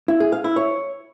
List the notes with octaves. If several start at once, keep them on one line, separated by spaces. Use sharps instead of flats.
E4
G#4
F5
E4
C#5